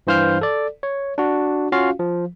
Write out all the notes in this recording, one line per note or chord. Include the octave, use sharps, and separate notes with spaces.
G2 E3 C5 F5 F6 G6
A4 D5
C#5
D4 F#4
C#4 F4 F#4 F5
F3